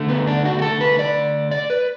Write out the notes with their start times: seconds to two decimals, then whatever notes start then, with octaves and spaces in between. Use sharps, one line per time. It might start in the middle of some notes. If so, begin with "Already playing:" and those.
Already playing: D3 A3
0.09 B3
0.27 D4
0.45 F#4
0.59 F#4
0.62 A4
0.81 B4
0.99 D5
1.51 D5
1.70 B4